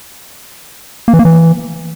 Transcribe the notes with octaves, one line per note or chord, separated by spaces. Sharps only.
A#3
E3
A#3
E3